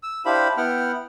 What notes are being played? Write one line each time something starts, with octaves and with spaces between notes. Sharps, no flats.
E6
D4 E4 G4 C5 F5 B5
B3 E4 F#5 G5 F6